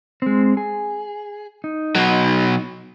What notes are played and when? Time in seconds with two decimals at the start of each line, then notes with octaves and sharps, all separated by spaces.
0.22 G#3 C4
0.57 G#4
1.64 D#4
1.96 B2 F#3